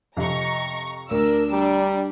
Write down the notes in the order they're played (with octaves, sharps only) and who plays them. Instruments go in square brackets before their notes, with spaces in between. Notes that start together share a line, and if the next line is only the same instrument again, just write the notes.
[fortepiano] F2 C3 [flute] D#5 [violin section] A#5 C#6
[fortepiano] D2 [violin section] D4 E6 [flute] A#4
[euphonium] G3 [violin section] D4 [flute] A#5